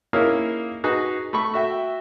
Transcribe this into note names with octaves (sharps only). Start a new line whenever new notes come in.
A#3 C#4 D#4 E4 G#4 A#4
D#4 F#4 G#4 B4
A3 B5 C#6
F#4 E5 G5